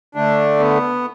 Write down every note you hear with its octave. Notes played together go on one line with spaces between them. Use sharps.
D3 A3 D4
B3